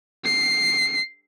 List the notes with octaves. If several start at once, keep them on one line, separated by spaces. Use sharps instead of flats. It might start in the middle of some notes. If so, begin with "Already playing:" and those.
C7